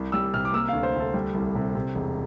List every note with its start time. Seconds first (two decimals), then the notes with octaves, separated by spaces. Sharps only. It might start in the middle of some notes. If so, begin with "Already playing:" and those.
Already playing: C2
0.12 G3 E6
0.34 C3 F6
0.45 D6
0.53 A#3 E6
0.69 F5
0.73 D2
0.83 C5
0.94 D2
1.00 A4
1.14 G3
1.34 C2
1.55 C3
1.75 C3
1.95 E1